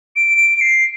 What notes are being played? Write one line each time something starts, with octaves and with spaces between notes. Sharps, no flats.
D7
D7
C7